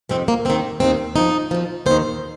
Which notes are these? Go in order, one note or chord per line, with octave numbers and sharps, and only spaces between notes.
F2 C3 D#3 C4
A#3
D#2 D#3 C4
D#2 D#3 C4
F2 F3 D#4
F2 F3
D#2 D#3 C5